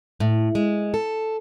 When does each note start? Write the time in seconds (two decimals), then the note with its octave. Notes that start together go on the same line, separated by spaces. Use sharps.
0.20 A2
0.55 G#3
0.94 A4